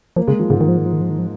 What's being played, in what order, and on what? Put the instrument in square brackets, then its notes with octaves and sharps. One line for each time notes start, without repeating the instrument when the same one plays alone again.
[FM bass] F3 [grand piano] A#3
[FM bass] C#3 [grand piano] G#3
[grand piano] F3
[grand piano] G#2 [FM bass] C#3
[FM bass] D#3
F3
D#3
F3
D#3
F3
D#3
F3